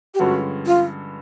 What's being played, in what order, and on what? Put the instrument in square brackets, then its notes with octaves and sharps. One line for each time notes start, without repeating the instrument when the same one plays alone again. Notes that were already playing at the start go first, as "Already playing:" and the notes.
[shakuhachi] G4
[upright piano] G2 D3 F3 G#3 C#4 [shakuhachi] F#4
[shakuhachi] F4